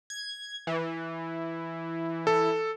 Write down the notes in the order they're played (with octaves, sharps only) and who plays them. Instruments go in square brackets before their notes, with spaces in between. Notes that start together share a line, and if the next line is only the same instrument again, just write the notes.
[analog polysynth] G#6
E3
[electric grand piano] A4